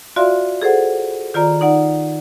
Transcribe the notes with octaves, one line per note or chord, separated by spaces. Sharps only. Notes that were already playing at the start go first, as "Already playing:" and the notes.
F4 F#4 D5 E5 F5 C6
G#4 A4 C5 F#5
D#3 F4 D5 A#5
D#4 D5 F#5